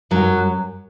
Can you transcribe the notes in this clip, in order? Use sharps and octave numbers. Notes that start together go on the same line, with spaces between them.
F#2 F#3